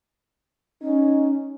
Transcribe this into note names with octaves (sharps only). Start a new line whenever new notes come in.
C#4 D#4